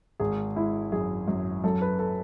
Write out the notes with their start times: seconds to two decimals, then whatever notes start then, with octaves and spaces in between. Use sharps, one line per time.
0.20 G#1 G#4
0.56 G#3 E4
0.92 F#2 G#4
1.28 F#2
1.64 F#2 A4
1.82 B4
1.99 A4